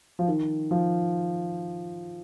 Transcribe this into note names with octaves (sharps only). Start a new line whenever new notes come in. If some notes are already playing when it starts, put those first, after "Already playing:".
F3
D#3
F3